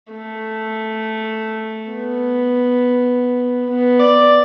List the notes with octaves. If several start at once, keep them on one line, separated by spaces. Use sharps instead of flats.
A3
B3
B3
D5